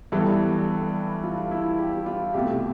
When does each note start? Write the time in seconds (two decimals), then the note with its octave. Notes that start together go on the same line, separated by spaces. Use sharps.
0.12 G2 E3 G3 B3 A4
0.68 A4
1.23 F4
1.51 E4
1.79 G4
2.06 F4
2.34 C2 B2 A3 G4